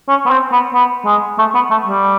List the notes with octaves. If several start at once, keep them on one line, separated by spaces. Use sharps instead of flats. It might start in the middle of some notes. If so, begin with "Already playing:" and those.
C#4
B3
C4
B3
B3
G#3
A3
B3
A3
G3